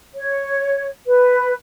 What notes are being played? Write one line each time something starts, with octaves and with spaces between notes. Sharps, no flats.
C#5
B4